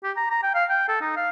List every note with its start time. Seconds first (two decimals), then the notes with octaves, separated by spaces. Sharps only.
0.04 G4
0.16 A#5
0.30 A#5
0.43 G5
0.55 F5
0.69 G5
0.88 A4
1.01 D#4
1.16 F5